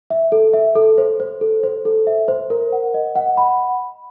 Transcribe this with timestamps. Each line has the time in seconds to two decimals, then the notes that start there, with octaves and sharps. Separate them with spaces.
0.10 E5
0.32 A4
0.54 E5
0.76 A4
0.98 C5
1.20 C5
1.41 A4
1.63 C5
1.85 A4
2.07 E5
2.28 C5
2.50 A#4
2.72 F#5
2.94 D#5
3.15 F#5
3.37 B5